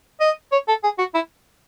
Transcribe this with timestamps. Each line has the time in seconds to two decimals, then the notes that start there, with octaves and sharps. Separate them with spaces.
0.21 D#5
0.52 C#5
0.68 A4
0.84 G#4
0.99 F#4
1.14 E4